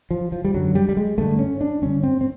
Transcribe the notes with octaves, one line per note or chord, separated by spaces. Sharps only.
F3
F3
G3
F#2 D3 F#3
G3
G3
G#3
G2 D3 A3
C#4
D4
G2 D3 C#4
C4
C4